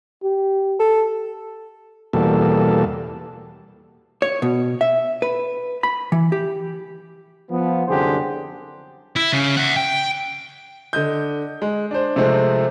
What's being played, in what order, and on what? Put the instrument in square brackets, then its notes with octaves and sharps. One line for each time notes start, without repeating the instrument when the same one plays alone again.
[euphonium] G4
[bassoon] A4
[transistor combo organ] E2 B2 G3 A#3 A4
[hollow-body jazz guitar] C#5
B2
E5
B4
B5
E3
G4
[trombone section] F3 B3
C2 F#2 D3 G4 G#4 C5
[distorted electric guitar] E4
C#3
E5 F#5
G5
[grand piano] D3 D#5 G6
G#3
D4 C5
C3 F3 G#3 A3 C4